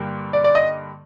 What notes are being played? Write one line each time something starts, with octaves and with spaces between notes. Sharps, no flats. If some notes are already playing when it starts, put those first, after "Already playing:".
Already playing: G2 D3 G3 A#3
D5
D5
D#5